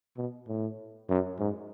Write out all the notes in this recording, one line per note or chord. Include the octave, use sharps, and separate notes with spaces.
B2
A2
F#2
G#2